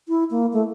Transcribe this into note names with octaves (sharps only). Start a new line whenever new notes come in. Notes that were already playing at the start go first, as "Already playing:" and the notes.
E4
A#3
A3